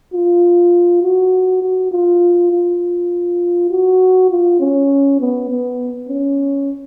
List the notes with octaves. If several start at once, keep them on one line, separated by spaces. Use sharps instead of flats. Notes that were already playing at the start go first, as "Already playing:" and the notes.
F4
F#4
F#4
F4
F4
F#4
F4
C#4
B3
B3
C#4